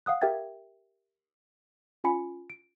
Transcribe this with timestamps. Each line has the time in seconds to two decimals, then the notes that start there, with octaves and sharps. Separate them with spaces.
0.06 F5 F#5 D#6 F#6
0.21 G4 A#4 E5 G5 G#6 A6
2.04 C#4 F4 G#5 B5 C#7
2.50 D7